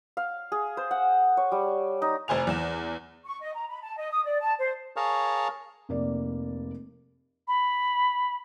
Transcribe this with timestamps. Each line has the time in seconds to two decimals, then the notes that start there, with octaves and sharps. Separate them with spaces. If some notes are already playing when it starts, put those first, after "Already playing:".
0.17 F5
0.52 G#4
0.77 C5
0.91 F#5
1.37 C#5
1.52 G3
2.02 D#4
2.28 F1 C5 G#5 F7
2.47 E2 E7
3.25 C#6
3.41 D#5
3.54 A#5
3.68 B5
3.82 A5
3.96 D#5
4.12 D#6
4.25 D5
4.39 A5
4.58 C5
4.96 G#4 A#4 C#5 F5 A5
5.89 F1 A#3 D5
7.48 B5